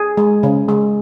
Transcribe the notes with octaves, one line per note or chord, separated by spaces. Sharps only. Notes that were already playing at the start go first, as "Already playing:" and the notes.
Already playing: G#4
G#3
C#3
G#3